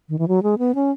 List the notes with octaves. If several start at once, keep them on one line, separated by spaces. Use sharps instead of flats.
D#3
E3
F#3
G#3
B3
C#4